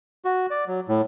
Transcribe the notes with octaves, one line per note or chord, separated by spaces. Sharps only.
F#4
D5
F#3
A2